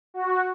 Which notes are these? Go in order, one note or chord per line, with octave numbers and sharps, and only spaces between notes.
F#4